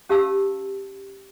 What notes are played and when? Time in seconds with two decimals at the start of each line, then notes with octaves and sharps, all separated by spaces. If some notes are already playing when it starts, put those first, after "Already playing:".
0.09 C#4 G4 F5 A5 E6